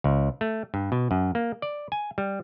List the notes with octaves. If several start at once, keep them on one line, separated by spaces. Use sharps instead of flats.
C#2
A3
G2
B2
F#2
A#3
D5
G#5
G3